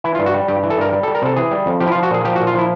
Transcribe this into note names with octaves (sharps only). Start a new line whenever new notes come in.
E3 E4
F4
G2
F#4
G3
G2 G4
E3
A4
G2 A#4
G3
A4
G3
A#4
C3 A4
E3 G#4
G3
F2
F3 G4
E4
F4
F3
F#4
A#2 G#4
F3 G4
F#4
A#2
F4
F3 E4